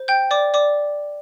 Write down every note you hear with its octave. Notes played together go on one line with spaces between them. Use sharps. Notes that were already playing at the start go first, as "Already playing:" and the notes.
Already playing: C5
G5 G6
D5 D6
D5 D6